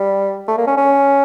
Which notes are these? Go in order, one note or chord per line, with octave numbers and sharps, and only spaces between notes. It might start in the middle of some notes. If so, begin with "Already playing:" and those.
Already playing: G3
A3
A#3
C#4
C#4